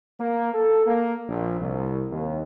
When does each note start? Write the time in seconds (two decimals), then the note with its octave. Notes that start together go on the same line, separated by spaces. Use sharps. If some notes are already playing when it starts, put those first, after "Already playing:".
0.19 A#3
0.54 A4
0.87 A#3
1.28 A#1
1.59 C2
2.11 D#2